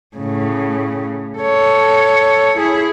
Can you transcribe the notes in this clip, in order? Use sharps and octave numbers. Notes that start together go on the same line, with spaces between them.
A2 C#3
A4 C#5
E4 G#4